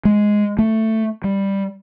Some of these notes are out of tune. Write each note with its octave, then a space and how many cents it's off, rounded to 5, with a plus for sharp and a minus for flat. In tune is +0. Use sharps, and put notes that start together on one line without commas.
G#3 +0
A3 +10
G3 +5